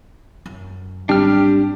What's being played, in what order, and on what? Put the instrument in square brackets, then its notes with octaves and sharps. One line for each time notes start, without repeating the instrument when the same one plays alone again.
[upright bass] F#2
[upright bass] G#1 F#3 [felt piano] G3 [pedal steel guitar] D4 F6 [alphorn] G4